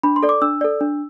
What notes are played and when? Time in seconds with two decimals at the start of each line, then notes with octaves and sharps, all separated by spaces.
0.03 D4 B5
0.16 C6
0.23 A4 D5
0.29 D6
0.42 D4 E6
0.61 A4 D5
0.81 D4